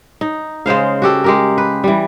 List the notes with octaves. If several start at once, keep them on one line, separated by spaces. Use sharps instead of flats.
D#4
C#3 G#3 C5 F5
F#4 G4 A4
G#3 G4 A#4
B4
E3 G3